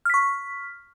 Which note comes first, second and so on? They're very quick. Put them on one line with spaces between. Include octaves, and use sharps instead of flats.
F6 B6 C#6